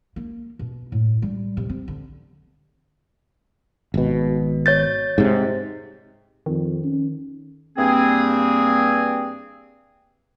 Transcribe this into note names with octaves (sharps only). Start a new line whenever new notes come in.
A#3
B2
A2
G3
C3
C4
D3
G#1 B2
C#5 G6 A6
G#2 C3
F2 D#3
C#4
G2 A#3 C4 G#4